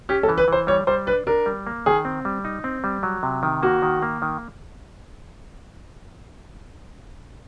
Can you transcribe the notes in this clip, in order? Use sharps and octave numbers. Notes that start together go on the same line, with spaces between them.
C#4 G4
A4
E3
B4
E3 C5
G3 C#5
G3 C5
D4 B4
D4 A#4
G3
A#3
D#3 G#4
C4
G3
D#4
C4
G3
F#3
C3
D#3
A#3 F#4
D#3
A#3
D#3